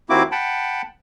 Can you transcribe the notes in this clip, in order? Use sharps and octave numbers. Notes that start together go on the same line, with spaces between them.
D#2 A#3 C4 E4 F#4 D6
F#5 G5 A5 B5